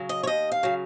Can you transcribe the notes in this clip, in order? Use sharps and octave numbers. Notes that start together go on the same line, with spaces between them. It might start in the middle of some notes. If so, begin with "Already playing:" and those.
Already playing: C#3 F#3
D#5
C#5
D#2 D#5
F5
C#3 F#3